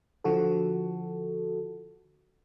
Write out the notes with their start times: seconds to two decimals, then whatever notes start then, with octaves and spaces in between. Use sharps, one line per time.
0.24 D3 F3 F#4 A4